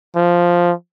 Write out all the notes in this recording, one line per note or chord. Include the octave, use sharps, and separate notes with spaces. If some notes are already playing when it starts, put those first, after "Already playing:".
F3